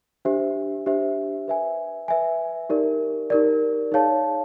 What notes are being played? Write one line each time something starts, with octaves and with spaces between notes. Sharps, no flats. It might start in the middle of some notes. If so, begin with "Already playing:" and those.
D4 G4 C5 E5
D4 G4 C5 E5
B4 E5 G#5
B4 E5 G#5
D#4 G4 A#4 D5
D#4 G4 A#4 D5
D#4 G#4 C#5 F5 A5